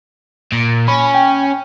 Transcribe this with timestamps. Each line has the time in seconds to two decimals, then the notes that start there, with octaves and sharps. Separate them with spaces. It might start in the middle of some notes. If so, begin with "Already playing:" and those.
0.52 A#2
0.88 C#4 B5
1.15 G5